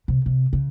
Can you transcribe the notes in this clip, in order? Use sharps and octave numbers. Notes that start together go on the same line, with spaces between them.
C3
C3
C#3